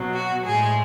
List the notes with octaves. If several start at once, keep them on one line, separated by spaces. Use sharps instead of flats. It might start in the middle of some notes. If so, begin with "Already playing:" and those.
Already playing: B2 F#3
F#4
A2 G#3 G#4